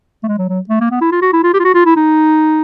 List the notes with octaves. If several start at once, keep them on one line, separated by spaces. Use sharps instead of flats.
A3
G#3
F#3
F#3
A3
A#3
B3
E4
F4
F#4
E4
F4
G4
F4
F#4
F4
E4
D#4